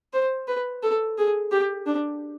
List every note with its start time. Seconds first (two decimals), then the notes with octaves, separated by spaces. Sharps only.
0.13 C5
0.48 B4
0.83 A4
1.18 G#4
1.52 G4
1.86 D4